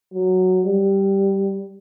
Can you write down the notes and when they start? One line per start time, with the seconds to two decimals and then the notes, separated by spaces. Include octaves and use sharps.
0.14 F#3
0.66 G3